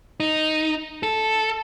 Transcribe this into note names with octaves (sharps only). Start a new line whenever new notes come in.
D#4
A4